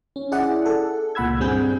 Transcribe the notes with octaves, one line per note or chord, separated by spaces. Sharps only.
C#4
E4 G#4 D5 F#5
A4
C#2 A#2 F#5 B5 E6 G#6
G2 G3 C4 G#4 G6